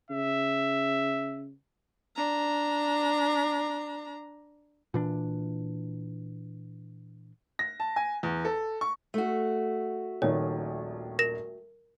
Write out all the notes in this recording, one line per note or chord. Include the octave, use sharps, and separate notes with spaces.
C#3 E5
D4 A#5
A#2 E3 D4
A#6
A5
G#5
E2
A4
C#6
A3 F#4
D#1 A#1 D#3 C#5
A#4 A#6 E7